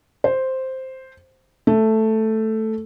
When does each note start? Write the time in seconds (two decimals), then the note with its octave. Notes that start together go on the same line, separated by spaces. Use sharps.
0.24 C5
1.67 A3